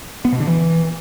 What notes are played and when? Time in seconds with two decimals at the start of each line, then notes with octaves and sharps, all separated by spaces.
0.25 B3
0.32 B2
0.40 D3
0.48 E3